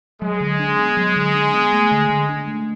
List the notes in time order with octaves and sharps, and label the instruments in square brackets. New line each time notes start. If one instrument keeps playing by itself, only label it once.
[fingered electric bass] F#3 [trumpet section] G#3
[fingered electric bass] D3
D4
B3
F#3
D3
D4
B3
A3
D3
D3
D4
A3